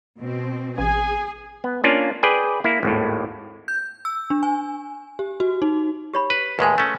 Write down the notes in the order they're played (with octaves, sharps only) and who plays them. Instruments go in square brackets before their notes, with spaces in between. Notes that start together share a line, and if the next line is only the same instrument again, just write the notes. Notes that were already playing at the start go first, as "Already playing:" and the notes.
[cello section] B2 C4
[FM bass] A1 [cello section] G#4 [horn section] G#5
[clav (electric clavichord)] B3
A#3 C#4 D4 F4
G#4 B4 D5 G5 G#5
A#3 E4
G#1 D#2 A2
[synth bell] G6
E6
D4
G#5
G4
F#4
D#4
[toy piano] G4 C#5 B5
[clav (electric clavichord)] B4
[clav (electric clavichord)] D#2 A2 G#3 [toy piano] B4 G#5
[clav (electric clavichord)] A3 C#4